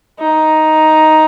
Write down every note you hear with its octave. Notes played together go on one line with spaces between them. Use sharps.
D#4